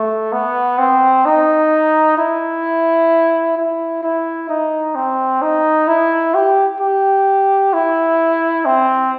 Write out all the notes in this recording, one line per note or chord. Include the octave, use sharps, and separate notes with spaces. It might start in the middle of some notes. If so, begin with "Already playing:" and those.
Already playing: A3
B3
C4
D#4
E4
E4
E4
D#4
C4
D#4
E4
G4
G4
E4
C4